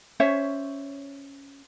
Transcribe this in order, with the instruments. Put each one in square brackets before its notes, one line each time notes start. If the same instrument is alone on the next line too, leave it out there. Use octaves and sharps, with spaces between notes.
[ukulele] C#4 C5 C#5 E5